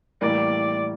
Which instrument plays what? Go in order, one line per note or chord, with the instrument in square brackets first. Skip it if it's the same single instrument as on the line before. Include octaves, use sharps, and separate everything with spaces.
[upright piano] A2 E3 G3 A#3 [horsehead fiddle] D5